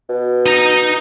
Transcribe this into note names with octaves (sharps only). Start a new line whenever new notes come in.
B2
D#4 A#5